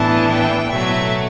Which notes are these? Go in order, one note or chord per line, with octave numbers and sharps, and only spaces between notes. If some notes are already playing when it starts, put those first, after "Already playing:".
Already playing: A2 E3 B3 D4 A5
G5
B2 F#3 A3 E5